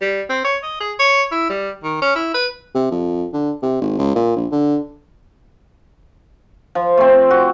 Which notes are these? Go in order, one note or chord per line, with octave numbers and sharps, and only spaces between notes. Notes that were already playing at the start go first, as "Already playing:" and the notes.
G3
C4
C#5
D#5
G#4
C#5
E4
G3
D#3
C#4
E4
B4
C3
F2
D3
C3
G#1
C#2
A#2
A#1
D3
F3
A3 C4
F#4